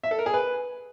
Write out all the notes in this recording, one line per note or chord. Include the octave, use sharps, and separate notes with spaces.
E5
A4
A#4
G#4
B4